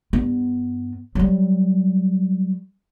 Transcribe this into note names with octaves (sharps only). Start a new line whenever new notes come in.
G2 B3
F#3 G3